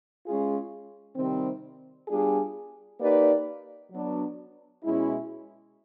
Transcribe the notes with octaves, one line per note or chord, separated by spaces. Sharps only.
G#3 C#4 F4 G#4
C3 D#3 G3 C4
G3 B3 D4 F4 G#4
A#3 D#4 G4 B4 D5
F#3 B3 D4
B2 G#3 C#4 E4